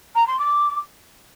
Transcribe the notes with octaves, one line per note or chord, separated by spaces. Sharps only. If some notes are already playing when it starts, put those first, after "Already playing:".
A#5
C6
D6